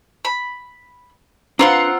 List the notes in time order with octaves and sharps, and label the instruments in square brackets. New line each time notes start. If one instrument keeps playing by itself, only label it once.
[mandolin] B5
[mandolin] C4 F4 F#5 [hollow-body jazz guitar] D4 B4 C5 [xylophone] A#5